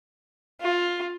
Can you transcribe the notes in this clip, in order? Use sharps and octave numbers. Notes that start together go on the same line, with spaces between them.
F4